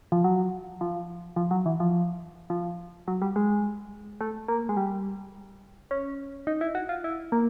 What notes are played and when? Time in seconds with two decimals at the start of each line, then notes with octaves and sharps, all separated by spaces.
0.12 F3
0.24 F#3
0.81 F3
1.36 F3
1.51 F#3
1.66 E3
1.80 F3
2.50 F3
3.08 F#3
3.22 G3
3.36 G#3
4.21 A3
4.48 A#3
4.69 G#3
4.77 G3
5.91 C#4
6.47 D#4
6.61 E4
6.75 F#4
6.89 F4
7.04 E4
7.32 A#3